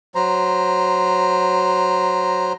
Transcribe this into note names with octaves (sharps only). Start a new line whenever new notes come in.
F#3 C5 A#5